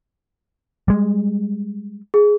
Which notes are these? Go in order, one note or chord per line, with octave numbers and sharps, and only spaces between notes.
G3 G#3
G#4